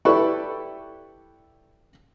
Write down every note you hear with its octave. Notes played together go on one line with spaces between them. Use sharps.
E4 G4 A4 B4 D5 C#6